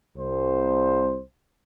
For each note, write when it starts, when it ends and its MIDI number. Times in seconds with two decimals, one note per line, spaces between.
0.17 1.21 36
0.17 1.21 72